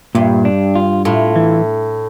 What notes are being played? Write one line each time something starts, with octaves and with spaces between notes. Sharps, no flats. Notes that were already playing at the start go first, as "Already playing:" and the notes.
G2 A#2
D4
F4
A2 F4
E3